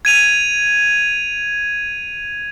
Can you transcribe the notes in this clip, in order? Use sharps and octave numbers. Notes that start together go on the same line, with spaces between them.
G#6 D#7 F7